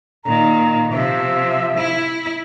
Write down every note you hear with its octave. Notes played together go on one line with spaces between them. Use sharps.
A#2 D#3 A#5
C3 F3 E5
E4